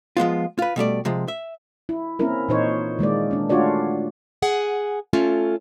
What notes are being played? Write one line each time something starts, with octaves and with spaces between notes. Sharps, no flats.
F3 G#3 B3 F4
F4 B4
B2 G3 A3 D5
C3 F3 G#3
E5
E4
A#3 C4 C#4 E4 A#4
A#2 E3 D#4 C5 C#5
D#3 G#3 A#3 D5
C#4 D4
A3 D4 F4 F#4 C#5 D5
G#4 F#5 G#5
A3 C#4 F4 A4